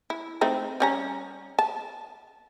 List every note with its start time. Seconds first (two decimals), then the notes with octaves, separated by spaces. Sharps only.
0.10 E4
0.41 A3 C4 D#4
0.80 G3 C#4 A#5
1.59 A5